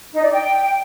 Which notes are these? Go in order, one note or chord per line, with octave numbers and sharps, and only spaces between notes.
D#4
D5
G5